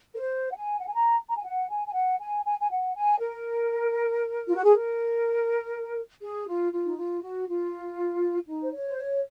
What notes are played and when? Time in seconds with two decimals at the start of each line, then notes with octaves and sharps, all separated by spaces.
0.14 A#4
0.18 C5
0.51 F#5
0.56 G#5
0.79 F#5
0.87 G#5
0.94 A#5
1.29 A#5
1.37 G#5
1.44 F#5
1.69 G#5
1.86 G#5
1.94 F#5
2.19 G#5
2.45 G#5
2.60 G#5
2.70 F#5
2.95 G#5
3.20 A#4
4.48 F4
4.55 F#4
4.64 G#4
4.71 A#4
6.22 G#4
6.47 F4
6.72 F4
6.86 D#4
6.97 F4
7.22 F#4
7.47 F4
8.47 D#4
8.63 C5
8.72 C#5
8.86 C5
8.97 C#5